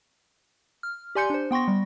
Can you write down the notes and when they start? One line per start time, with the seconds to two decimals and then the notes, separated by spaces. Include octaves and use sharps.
0.83 F6
1.15 G4 D5 G#5 C6 G6 C#7
1.30 D4 C5
1.51 B3 G5 C6 C#6 A#6
1.68 G3